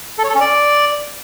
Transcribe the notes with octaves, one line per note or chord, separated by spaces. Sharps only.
A4
C#5
A4
C#4
D5